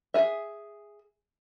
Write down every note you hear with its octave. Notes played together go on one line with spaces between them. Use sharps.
G#4 E5